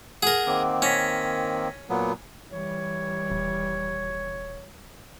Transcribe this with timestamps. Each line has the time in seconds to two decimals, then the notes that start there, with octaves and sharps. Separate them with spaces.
0.23 G#4 A#4 F#5
0.47 D#3 A#3 C4 F#5 D6
0.82 C#4 G#6 A#6 B6
1.90 A#2 F#3 B3
2.51 E3 G3 C#5
3.30 D#1